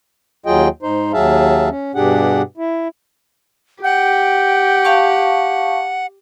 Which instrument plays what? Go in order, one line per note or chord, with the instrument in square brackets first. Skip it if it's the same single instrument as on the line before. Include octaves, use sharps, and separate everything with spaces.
[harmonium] D#2 F#3 F4 G#4 D#5 G5
G#2 D#4 C5
D#2 F#3 G#4 E5 F5 A5
C#4
G2 B2 D4 G4 G#4 F#5
E4
[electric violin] G4 [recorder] F#5 [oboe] G5
[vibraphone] F5 A5 C#6